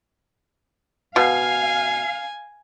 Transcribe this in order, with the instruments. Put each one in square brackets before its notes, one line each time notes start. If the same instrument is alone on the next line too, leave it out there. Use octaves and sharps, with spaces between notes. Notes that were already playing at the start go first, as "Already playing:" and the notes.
[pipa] B2 [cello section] F5 [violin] G#5